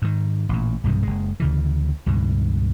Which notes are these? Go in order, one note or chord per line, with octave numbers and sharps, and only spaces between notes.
G#2 D#3
A1 A#2
B1 G2 C3 D#3
F#1 G#3
D2 C#3 E3
C#2 G2 B2 D#3